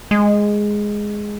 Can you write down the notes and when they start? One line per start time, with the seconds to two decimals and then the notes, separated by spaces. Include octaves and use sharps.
0.11 G#3